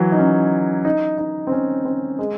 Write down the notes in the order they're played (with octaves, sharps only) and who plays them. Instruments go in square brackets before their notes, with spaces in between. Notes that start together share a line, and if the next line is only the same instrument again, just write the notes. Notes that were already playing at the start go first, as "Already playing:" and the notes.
Already playing: [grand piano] E3 F#3
D#4
C#4
D#4
D#4
C4
C#4
C4
G#3